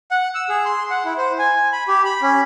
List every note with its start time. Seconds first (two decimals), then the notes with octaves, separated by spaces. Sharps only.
0.11 F#5
0.35 E6
0.49 G#4
0.65 C6
0.90 F#5
1.05 E4
1.17 C5
1.39 G#5
1.73 B5
1.88 G4
2.05 B5
2.22 C#4